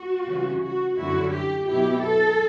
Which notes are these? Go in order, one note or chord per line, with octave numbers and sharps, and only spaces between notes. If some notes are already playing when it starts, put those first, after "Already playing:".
Already playing: F#4
C#3 E3 G3 C#4
F#4
F#2 D3 G3 C#4 E4 F#4
G4
B2 F#3 B3 E4 G4
A4